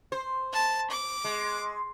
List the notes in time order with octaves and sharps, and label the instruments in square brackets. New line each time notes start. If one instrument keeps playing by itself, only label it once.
[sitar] C5
[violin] A5
D6
[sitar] G#3